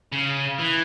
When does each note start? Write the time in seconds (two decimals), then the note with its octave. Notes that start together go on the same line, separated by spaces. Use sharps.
0.12 C#3
0.59 E3